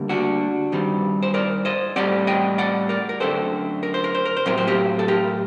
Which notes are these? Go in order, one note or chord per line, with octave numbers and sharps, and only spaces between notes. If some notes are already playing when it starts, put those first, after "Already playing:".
Already playing: D2 D3 G3 A#3
D4 F#4
G2 D#3 G3 C4
C5
A#4 D5
C5 D#5
A2 G3 C4 D5 F#5
D#5 G5
D5 F#5
A#4 D5
A#4
F#2 D3 A3 C4 A4 C5
A#4
C5
A#4
C5
A#4
C5
A2 F#3 C4 A#4
C5
G4 A#4
A4
G4 A#4